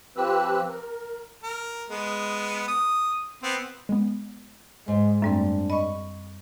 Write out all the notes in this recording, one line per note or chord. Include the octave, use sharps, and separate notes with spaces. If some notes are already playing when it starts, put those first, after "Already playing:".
F3 C4 G4 B4 E6 F#6
A#4
A#4
G#3 B3
D#6
B3 C4
G#3 B3
G#2 G#3
F#2 G3 A3 C4 D4
D#5 B5 C#6